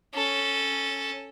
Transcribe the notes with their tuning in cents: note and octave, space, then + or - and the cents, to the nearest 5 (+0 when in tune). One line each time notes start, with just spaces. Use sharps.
C#4 +0 A4 +0